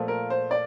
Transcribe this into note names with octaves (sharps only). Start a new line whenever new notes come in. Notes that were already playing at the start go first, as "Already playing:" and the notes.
Already playing: A#2 F3 A3
A#4
C5
D5